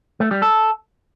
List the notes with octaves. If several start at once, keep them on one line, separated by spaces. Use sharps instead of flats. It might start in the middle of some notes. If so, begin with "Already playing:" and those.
A3
G3
A4